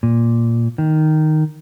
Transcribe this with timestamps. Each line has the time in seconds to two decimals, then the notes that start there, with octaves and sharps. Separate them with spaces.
0.03 A#2
0.78 D#3